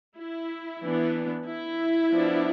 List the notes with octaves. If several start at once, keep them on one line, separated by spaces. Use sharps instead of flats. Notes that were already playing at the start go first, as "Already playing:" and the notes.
E4
E3 B3 D4
E4
F3 B3 D4